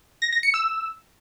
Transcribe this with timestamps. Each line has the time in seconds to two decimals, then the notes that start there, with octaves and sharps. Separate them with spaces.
0.22 A#6
0.32 A#6
0.43 C#7
0.54 E6